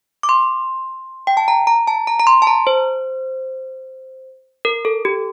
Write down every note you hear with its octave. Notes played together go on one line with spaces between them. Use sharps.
D6
C6
G5
A5
A#5
A#5
A5
A#5
A#5
C6
A5
A#5
C5
A#4
A4
G4